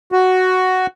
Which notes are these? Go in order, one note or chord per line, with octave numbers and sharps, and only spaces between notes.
F#4